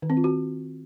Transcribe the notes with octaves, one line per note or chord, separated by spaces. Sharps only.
D#3
C4
F4
F#4